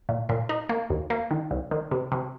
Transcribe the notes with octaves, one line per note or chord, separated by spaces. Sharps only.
A#2
A#2
D#4
A#3
D#2
A#3
D#3
C2
D#3
C3
C3